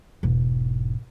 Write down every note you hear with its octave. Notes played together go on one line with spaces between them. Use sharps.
E1 G#2